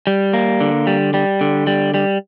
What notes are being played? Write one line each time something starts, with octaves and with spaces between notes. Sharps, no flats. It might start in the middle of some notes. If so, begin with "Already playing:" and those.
G3
A#3
D3
G3
G3
D3
G3
G3